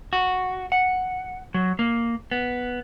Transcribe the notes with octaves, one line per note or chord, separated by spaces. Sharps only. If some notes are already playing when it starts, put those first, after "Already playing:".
F#4
F#5
F#3
A#3
B3